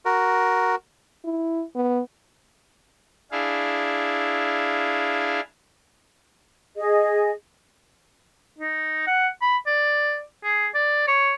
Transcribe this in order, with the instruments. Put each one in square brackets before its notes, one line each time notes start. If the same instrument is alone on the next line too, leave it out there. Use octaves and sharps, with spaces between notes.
[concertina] F#4 A#4
[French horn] E4
B3
[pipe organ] D4 E4 G#4 F5
[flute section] G#4 D#5
[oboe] D#4
F#5
B5
D5
G#4
D5
C#5